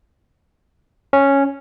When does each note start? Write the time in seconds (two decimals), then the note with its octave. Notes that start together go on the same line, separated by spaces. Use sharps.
1.13 C#4